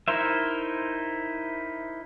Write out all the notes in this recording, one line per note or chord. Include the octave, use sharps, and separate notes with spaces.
D#4 E4 A#4 C5 E5